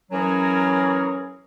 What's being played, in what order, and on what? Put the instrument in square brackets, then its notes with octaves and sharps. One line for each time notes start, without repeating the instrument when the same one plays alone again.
[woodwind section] E3 F#3 C#4 G#4 A#4